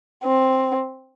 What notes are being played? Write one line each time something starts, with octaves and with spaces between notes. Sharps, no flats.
C4